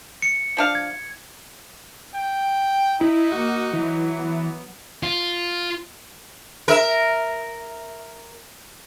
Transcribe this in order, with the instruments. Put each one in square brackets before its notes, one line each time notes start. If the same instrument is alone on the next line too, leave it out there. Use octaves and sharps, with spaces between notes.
[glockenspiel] C#7
[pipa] F3 D4 F5
[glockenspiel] G#6
[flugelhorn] G5
[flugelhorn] D#4 [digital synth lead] E4
[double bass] A#3 [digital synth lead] F#4
[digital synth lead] E3 [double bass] F#3
[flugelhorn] B3
[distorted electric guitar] F4
[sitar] A#4 E5